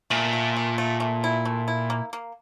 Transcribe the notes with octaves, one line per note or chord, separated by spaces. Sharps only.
A#2 A3
A3
A3
A3
A3
E4
A3
E4
A#3
A#3